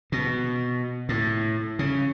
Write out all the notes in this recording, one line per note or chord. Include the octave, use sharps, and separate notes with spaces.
B2
A2
C#3